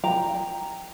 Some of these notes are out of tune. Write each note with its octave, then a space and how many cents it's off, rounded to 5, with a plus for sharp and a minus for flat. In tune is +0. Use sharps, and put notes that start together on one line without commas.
G5 +0 A#5 +0